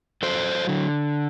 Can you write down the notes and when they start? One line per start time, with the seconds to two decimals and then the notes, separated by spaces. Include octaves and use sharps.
0.23 F#3 A4 C5
0.69 D3